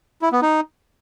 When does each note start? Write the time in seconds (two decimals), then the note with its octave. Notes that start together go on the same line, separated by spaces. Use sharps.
0.22 E4
0.32 B3
0.42 D#4